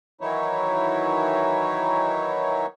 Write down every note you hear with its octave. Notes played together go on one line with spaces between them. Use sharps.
D#3 E3 F#3 D#4 E4 C#5